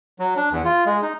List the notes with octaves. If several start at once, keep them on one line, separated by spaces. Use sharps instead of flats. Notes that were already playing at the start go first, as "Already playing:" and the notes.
F#3
D4
E2
F4
G#3
D#4